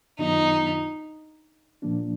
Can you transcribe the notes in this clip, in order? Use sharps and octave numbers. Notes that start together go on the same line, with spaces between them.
F#2 D#3 F#3 B3 D#4 F4
A#2 F3 A#3 D4